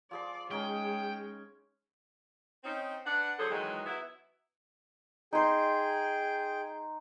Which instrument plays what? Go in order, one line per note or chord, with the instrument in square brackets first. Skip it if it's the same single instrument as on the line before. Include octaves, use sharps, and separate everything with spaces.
[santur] F3 G#4 C6 [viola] D5
[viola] G#3 [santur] C#4 D#4 G#5 [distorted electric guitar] G5
[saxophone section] C4 C#4 D#4
D4 B4 F#5
D3 F#3 G#4 A4 C5
D#3 E3 F#3 G#3
F#3 B3 E4
[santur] D#4 C6 [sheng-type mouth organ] G#4 G5